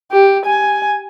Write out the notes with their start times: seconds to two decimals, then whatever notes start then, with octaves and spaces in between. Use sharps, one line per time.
0.12 G4
0.46 G#5